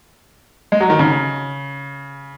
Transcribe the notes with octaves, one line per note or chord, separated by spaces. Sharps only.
G#3
F#3
D#3
C#3